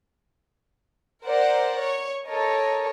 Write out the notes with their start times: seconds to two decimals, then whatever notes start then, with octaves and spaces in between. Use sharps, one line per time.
1.27 A#4 C5 D5 F#5
1.82 C#5
2.26 A4 A#4 C#5 D#5